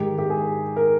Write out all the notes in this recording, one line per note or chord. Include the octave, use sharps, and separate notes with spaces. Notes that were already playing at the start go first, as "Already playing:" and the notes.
Already playing: G#2 D#3 G4
G4
G#4
A#4